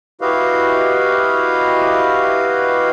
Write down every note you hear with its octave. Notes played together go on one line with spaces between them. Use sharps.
E4 F#4 G4 B4 D#5 F5